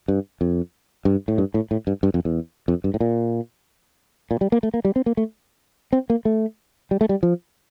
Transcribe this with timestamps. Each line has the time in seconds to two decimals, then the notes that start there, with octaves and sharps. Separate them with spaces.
0.08 G2
0.41 F2
1.05 G2
1.28 A2
1.38 G2
1.54 A2
1.71 A2
1.87 G2
2.03 G2
2.14 F2
2.25 E2
2.68 F2
2.84 G2
2.94 A2
3.01 A#2
4.31 A#2
4.41 G3
4.52 A#3
4.63 A3
4.74 A#3
4.85 G3
4.96 C4
5.06 A#3
5.17 A3
5.93 C4
6.10 A#3
6.25 A3
6.91 G3
7.01 A3
7.09 G3
7.23 F3